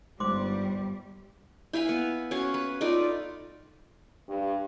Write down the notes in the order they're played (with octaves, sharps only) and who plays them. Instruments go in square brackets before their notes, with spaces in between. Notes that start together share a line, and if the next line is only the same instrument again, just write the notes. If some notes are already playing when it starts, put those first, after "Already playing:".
[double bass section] G1 [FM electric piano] G#2 [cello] G3 [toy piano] C5 C6 D6
[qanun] E4 B4 F5 G#5
B3
C#4 F#4 C#5 F5
B4
D#4 F4 A4 D5
[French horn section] G2